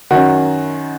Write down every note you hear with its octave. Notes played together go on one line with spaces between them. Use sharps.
F#2 D#3 F#4